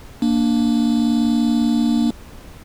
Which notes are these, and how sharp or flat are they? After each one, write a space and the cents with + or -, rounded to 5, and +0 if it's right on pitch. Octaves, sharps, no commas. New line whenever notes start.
A#3 +0 D4 +0